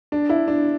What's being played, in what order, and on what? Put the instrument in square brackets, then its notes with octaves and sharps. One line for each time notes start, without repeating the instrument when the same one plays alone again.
[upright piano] D4
E4
D4